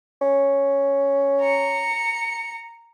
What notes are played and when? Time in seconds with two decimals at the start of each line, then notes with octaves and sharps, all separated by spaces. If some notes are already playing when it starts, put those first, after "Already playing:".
0.22 C#4
1.42 A#5 C#7